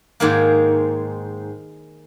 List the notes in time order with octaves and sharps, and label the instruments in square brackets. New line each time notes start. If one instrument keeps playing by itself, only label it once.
[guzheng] G#2 D#3 A#3 G#4